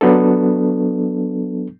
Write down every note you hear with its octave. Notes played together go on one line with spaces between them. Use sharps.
F#3 B3 D4 A4